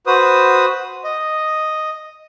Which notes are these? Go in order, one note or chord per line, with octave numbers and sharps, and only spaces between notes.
F#4 B4 C5 D#6
D#5